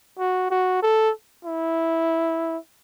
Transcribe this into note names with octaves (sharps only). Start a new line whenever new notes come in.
F#4
F#4
A4
E4